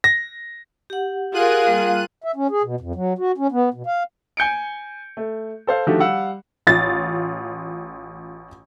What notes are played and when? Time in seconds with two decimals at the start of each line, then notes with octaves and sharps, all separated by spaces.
0.04 A#6
0.90 G4 F#5
1.34 F4 G#4 A#4 F5 F#6 D#7
1.67 G3 A#3
2.24 E5
2.36 C#4
2.51 G#4
2.64 B2
2.80 F2
2.95 F#3
3.18 F#4
3.38 C#4
3.52 B3
3.74 B2
3.87 F5
4.37 G#5 G6 C#7 D7
5.17 A3
5.67 A4 C5 F5
5.87 D3 D#3 F3 A3 F#4 G4
6.00 G3 F5 F#5 E6
6.67 A1 F4 A6